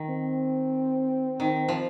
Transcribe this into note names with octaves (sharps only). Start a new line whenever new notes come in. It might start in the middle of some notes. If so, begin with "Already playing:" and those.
Already playing: D#3
C4
D#3
F3